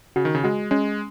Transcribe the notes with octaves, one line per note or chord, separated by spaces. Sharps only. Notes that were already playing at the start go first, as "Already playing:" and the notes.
C#3 F#4
D#3
C#3
G#3 F#4
G#3 C#4